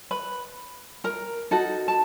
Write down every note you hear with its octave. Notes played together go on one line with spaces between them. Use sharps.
B4 B5
A#4 A#5
D#4 F#4 A4
A5